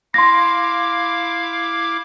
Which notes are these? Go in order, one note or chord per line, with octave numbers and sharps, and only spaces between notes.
E4 F5 C6 D6 A#6